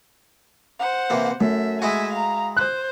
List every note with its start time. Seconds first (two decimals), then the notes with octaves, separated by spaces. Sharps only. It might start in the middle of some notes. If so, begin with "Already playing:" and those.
0.80 C5 F#5
1.10 C3 E3 A#3
1.41 F#2 A3 E5
1.82 G#3 E4 F#4 E5 G#5
2.13 F5 A#5
2.57 C5 F#6